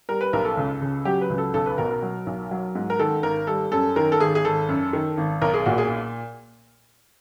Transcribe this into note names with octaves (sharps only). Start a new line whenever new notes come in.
G3 A#4
B4
B1 A#4
A4
C#2
C#3
F#3 G4
B4
C#2
A4
B1 A4
B4
B2 A#4
A#4
F#3
B1
F#3
G#2
A#4
D#3 A4
G#1 A#4
G3 A4
F#2 A4
D#3 A#4
A4
G#1 G#4
G#4
G#1 A4
F#2
D#3
G#1
B1 A#4
G#4
A#2 F#4
G#4